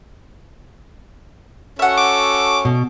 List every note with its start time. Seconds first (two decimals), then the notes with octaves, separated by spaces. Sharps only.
1.79 C#4 F#4 A4 E5 F#5
1.98 D6
2.65 B2